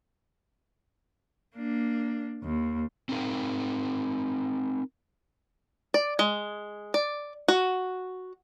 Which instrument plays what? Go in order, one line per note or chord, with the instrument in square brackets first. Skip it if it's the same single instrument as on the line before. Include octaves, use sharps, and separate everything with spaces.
[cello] A#3 D4
D#2
[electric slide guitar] C4 D4 D#4 A#4 F5 G5
[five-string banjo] D5
G#3
D5
F#4